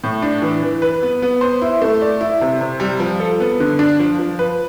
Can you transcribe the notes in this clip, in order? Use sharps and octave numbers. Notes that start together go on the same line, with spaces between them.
A2
D4
E3
E3
B4
B3
B3
C5
E4
A3
D5
E4
C3
C3
G3
F3
A4
B3
D3
D4
F3
F3
B4